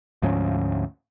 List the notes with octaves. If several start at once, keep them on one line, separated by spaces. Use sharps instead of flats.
D2 G#2 F3 C#4